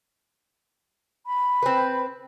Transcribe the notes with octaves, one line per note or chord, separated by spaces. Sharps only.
B5
C4 B4